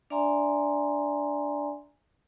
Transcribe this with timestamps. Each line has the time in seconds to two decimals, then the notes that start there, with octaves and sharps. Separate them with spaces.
0.10 D4 D5 E5 G#5 A#5 C6